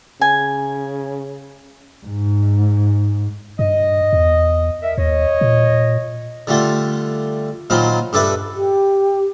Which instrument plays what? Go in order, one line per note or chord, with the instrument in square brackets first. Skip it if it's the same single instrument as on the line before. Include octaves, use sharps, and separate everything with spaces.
[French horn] C#3 [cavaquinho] G#5
[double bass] G#2
[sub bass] G2 [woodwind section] D#5
[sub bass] E2
[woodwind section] A#4 D#5 E5
[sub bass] D#2 [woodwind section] C#5 D#5
[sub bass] A#2
[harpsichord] D3 G3 A3 F4
A#2 D#3 F#3 F4 C5 B5
G2 D4 A4 B4 E5
[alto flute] G4